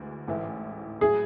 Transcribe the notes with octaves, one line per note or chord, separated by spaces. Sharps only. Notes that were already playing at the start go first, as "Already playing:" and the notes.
Already playing: D2 E3 G#3
A1 G#2 E3 A3
A2 F#3 A3 E4 G#4